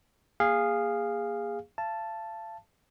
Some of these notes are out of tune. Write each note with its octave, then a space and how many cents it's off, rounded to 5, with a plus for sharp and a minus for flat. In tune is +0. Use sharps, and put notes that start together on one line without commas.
A#3 +0 G#4 -20 F5 +0
F5 -40 A5 +0